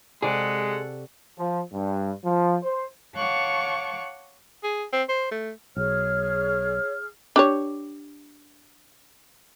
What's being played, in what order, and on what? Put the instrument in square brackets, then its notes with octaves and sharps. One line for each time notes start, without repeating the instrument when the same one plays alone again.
[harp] C3 D5 C#6 [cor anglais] G#3 [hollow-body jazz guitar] G#4 [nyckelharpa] A4 F#5
[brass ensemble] F3
G2
F3
C5
[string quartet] C#5 F5 F#5 A5 C#6 D6
[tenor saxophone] G#4
C4
C5
A3
[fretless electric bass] B1 [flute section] G#4 F6 [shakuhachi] C#5
[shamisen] D4 G4 C#5